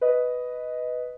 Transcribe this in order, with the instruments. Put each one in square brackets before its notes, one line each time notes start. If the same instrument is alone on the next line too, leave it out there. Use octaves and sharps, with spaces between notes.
[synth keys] B4 D#5